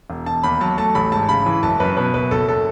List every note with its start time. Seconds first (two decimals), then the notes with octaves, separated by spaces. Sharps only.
0.10 E1
0.26 E1 A5
0.43 D#2 B5
0.61 F#3 A5
0.78 A3 A5
0.95 A1 B5
1.12 G#2 A5
1.29 C#3 B5
1.46 E3
1.63 F#1 A5
1.80 F#2 B4
1.97 B2 B4
2.14 F#1 B4
2.31 F#1 A4
2.48 A4